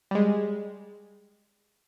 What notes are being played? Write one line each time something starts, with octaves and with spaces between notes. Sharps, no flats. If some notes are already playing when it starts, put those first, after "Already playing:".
G3 G#3